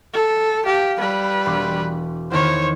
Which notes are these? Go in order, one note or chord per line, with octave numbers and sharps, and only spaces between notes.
A4
G4 F5 A5
G3 B4
E1 C6 D6
E2 D#3 E3 C5 C#5